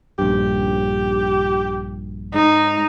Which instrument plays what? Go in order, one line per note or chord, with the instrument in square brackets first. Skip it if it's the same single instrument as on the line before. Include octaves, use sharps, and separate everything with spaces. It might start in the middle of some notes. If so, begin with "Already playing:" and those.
[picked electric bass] A#1 G2 [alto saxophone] G4
[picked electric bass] G#2 [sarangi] D#4